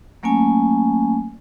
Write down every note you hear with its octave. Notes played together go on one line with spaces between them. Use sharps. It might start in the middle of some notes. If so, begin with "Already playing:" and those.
F#3 A3 A#3 C#4 G#5